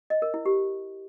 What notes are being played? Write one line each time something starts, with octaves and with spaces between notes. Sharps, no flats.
D#5
A#4
E4
G4